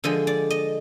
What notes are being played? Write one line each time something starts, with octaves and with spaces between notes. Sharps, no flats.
D3 F3 G#3 D#5
D5
D#5